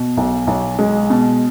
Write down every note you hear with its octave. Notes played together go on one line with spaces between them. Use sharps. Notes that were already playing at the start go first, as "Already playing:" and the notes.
Already playing: B2
B1
B1
G#3
B2